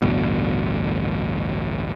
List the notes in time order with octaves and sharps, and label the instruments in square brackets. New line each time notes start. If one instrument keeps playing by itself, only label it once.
[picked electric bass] A1 D2 G2 B2